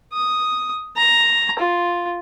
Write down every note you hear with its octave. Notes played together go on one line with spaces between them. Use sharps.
D#6
A#5
F4